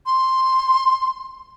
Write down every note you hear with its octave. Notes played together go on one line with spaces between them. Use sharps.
C6